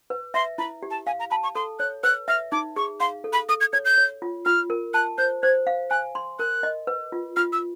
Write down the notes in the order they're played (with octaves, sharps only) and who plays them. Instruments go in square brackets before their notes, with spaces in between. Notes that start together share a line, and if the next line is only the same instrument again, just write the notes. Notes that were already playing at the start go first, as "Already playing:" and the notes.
[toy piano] B4
[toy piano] E5 [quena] C6
[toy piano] E4 [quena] B5
[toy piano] G4
[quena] A5
[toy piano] F5 [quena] G#5
[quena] A#5
[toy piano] A5 [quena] B5
[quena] C#6
[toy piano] A4 [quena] C6
[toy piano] C#5 [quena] F#6
[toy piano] B4 [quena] F#6
[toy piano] E5 [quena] F6
[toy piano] D#4 [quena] D6
[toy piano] G#4 [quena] C#6
[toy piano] F5 [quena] C6
[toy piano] A4
[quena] B5
[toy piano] A4 [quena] D#6
[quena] G#6
[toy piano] C#5 [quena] G#6
[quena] G6
[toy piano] C#5
F4
[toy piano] F4 [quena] F6
[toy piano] A#4
[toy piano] A5 [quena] F#6
[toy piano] C5 [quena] G6
[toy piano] C5 [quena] G#6
[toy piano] F5
[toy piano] G#5 [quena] F#6
[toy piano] C6
[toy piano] A#4 [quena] F#6
[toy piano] D#5
B4
F4
[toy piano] F4 [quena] F6
[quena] E6